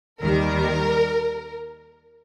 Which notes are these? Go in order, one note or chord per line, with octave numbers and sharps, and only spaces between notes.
D#2 D#3 G3 A#4